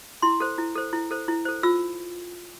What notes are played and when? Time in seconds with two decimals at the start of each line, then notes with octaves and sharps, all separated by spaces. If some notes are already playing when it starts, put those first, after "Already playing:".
0.22 E4 C6
0.40 A4 C5
0.58 E4
0.76 A4 C5
0.93 E4
1.11 A4 C5
1.28 E4
1.45 A4 C5
1.63 F4 E6